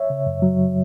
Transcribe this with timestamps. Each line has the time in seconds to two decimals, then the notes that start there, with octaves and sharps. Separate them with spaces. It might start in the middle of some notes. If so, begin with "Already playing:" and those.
Already playing: C#5 E5
0.10 C#3
0.26 F#2
0.42 F#3